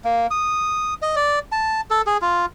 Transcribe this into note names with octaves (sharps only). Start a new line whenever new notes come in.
A#3
D#6
D#5
D5
A5
A4
G#4
F4